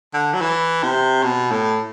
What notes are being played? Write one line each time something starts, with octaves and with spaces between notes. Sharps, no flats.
D3
F#3
E3
C3
B2
A2